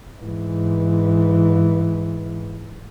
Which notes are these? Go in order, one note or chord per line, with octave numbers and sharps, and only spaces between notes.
G#2 E3